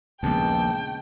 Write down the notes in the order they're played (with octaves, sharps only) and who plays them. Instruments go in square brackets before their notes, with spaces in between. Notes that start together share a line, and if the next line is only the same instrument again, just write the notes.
[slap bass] A#1 D#2 [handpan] C#3 G#3 B3 [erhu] G5 [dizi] A5